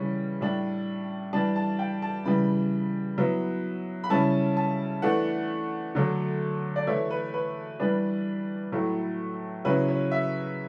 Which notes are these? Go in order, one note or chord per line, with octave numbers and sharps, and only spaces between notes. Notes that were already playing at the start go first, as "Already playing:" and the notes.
Already playing: C#3 E3 G3 C#4
A2 G3 D4
E3 G3 D4 A5
A5
G5
A5
C#3 E3 G3 B5
F#3 B3 E4
B5
C#3 G3 C#4 E4 A5
A5
E3 A3 D4 F#5
D3 F#3 A3
D5
E3 A3 E4 C#5
B4
B4
E3 G3 D4 B4
A2 F#3 A3 E4
C#3 F#3 C#4 E4 B4
C#5
E5